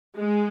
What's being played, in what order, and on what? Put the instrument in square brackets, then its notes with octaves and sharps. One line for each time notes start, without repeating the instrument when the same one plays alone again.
[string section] G#3